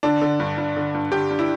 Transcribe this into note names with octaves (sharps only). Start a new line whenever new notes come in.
D3 D4
D3
G2
G2
D3
G2
D3 G4
G2
E4